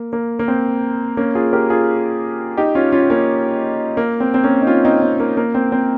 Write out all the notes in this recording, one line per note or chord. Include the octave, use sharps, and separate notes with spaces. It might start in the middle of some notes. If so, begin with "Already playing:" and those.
Already playing: A#3
A#3
A#3
C4
A#3 C#4
F4 G#4
G4 A#4
F4 G#4
D#4 G4
C#4 F4
C#4 F4
A#3 C#4
A#3
C4
C4
A#3 C#4
D#4
C#4 F4
C4 D#4
C4
A#3
A#3
C4
C4